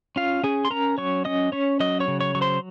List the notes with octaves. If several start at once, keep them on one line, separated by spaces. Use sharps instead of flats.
C#4 F4 F5
C#4 G#4 G#5
C6
C#4 A#4 A#5
F#3 C#5 C#6
C#4 D#5 D#6
C#4 C#5 C#6
F#3 D#5 D#6
C#5 C#6
C#3
C#5 C#6
F#3 C#6
C5 C6